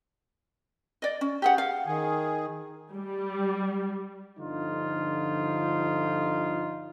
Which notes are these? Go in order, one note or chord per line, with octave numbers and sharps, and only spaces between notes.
D5 D#5
C#4
G4 G#4 F#5
F5
D#3 G#4
G3
G1 D3 F3 D#4 F4